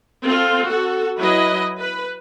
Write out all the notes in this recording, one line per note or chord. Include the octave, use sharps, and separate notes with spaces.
C4 F4 A4
F#4 A4
F#3 E4 B4 D#5
B4